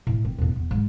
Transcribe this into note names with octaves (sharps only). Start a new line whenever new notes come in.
A2
C4
E2 A2
E2
G#2